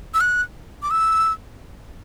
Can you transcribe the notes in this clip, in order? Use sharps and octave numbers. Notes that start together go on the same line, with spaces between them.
E6
F#6
D6
E6